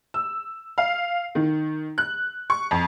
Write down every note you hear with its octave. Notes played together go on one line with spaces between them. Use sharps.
E6
F5
D#3
F#6
C#6
F2